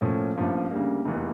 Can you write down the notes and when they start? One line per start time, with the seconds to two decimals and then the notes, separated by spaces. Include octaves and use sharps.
0.01 A2 F3 A#3 C#4
0.36 A1 G2 F3 A#3
0.71 D2 C#3 G3 A#3
1.05 F1 E2 E3 A#3